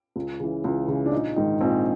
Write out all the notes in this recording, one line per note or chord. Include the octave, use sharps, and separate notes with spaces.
C#2
C#3 E3
C#2
C#3 E3
D4
A#1 D#4
G#2 D#3 D#4
A#1 C4